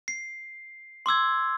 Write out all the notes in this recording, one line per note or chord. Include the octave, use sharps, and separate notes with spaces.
C7
C6 D6 E6 G#6